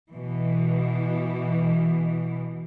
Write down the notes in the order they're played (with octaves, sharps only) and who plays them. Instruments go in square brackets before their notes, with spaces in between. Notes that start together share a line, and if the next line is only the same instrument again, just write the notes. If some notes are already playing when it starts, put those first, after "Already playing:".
[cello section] B2 E3